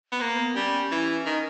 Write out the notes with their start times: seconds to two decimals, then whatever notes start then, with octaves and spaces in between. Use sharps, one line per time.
0.11 B3
0.21 A#3
0.33 B3
0.56 G3 C#4
0.91 E3
1.26 D#3